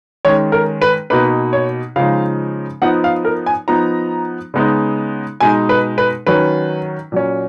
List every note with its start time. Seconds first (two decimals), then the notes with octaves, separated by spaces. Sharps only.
0.25 D#3 G#3 C#4 C#5
0.52 A#4
0.82 B4
1.10 B2 A#3 D#4 B4
1.53 C#5
1.96 C#3 F3 G#3 D#4 F5
2.82 F3 B3 D#4 F#5
3.04 F5
3.25 A#4
3.46 G#5
3.68 F3 B3 D#4 A#5
4.54 C#3 G#3 B3 D#4
5.40 B2 G#3 D#4 G#5
5.69 B4
5.98 B4
6.26 D#3 F#3 C#4 B4
7.12 A#2 F#3 C#4